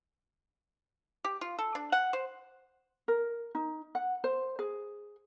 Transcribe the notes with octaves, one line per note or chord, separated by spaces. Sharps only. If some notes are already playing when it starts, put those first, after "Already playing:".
G4
F4
A4
D4
F#5
C5
A#4
D#4
F#5
C5
G#4